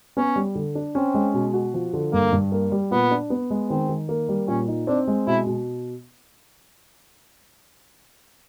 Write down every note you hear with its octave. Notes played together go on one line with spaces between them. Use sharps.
B3 C#4
G3
D3
D4
C4 C#4
G#3
B2
F#4
F3
D3
G2 A#3
G2
A#3
G3
A#2 B3
D4
B3
G#3
D#3 C4
D#3
A#3
G3
A#2 C#4
D#4
C4 D4
G#3
B2 E4
B2